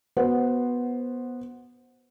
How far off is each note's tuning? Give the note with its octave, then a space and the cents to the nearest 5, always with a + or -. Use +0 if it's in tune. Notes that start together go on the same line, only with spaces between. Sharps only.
B3 -10 F#4 +0 C5 +0